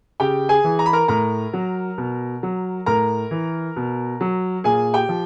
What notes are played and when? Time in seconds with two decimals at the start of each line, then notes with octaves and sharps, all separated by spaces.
0.20 C#3 G4 G5
0.49 G#4 G#5
0.64 E3
0.79 A#5
0.86 B5
0.93 A#4 A#5
1.08 A2 A#4 A#5
1.53 F#3
1.98 B2
2.43 F#3
2.86 A2 A#4 A#5
3.31 E3
3.76 B2
4.21 F#3
4.64 A#2 G#4 G#5
4.94 G4 G5
5.09 F3